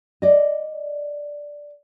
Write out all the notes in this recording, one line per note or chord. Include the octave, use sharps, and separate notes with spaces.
D5 D#5